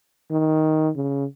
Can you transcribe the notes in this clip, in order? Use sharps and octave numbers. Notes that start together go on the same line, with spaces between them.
D#3
C#3